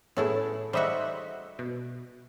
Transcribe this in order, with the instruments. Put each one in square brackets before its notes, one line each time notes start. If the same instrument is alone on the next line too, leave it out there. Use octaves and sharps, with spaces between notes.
[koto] A2 A3 E4 [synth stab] B3 C#4 G#4
[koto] G3 D#4 F#4 [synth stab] C5 D#5 E5
[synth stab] B2